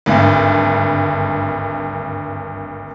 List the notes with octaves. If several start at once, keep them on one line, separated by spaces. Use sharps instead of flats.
G#1 D2 G2